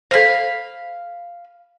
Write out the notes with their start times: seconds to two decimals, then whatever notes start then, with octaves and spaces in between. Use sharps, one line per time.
0.11 A4 C5 F5 B5